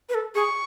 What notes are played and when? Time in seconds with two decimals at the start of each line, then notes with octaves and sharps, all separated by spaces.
0.09 B4
0.14 A4
0.35 G#4 C#6